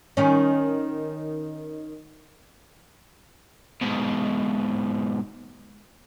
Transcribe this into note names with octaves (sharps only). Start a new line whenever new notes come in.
D#3 C#4
G#2 B2